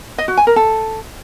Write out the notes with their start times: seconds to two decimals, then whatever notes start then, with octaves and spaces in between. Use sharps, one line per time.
0.18 D#5
0.28 F#4
0.37 G#5
0.47 A#4
0.56 A4